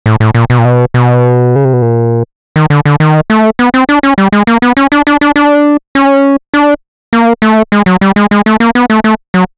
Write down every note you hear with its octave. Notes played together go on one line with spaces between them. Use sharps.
A2
A2
A#2
B2
A#2
B2
B2
C#3
C3
B2
A#2
D#3
D3
D3
D#3
A3
B3
C4
D4
C#4
G3
G#3
A#3
B3
C#4
D4
D4
D4
D4
C#4
D4
A#3
A3
G#3
F#3
G3
G#3
G#3
A3
A#3
B3
A3
A3
F#3